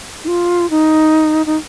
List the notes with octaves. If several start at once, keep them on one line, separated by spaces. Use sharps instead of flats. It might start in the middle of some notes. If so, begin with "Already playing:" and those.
D#4
F4
D#4
D#4